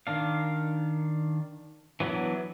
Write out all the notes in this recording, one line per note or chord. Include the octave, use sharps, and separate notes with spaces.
D#3 D4 F5
E3 F#3 B3 D4